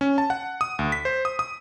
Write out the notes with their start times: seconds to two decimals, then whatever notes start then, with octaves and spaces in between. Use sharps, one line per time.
0.01 C#4
0.18 A5
0.30 F#5
0.61 D#6
0.79 D2
0.92 B6
1.05 C5
1.25 D#6
1.39 D#6